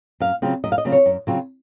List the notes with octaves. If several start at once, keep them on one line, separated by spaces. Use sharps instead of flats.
F#2 F5
C#3 F#3 C4 F4
F#2 D#5
F5
D#5
C#3 F#3 C4 F4
C#5
F#2
C#3 F#3 C4 F4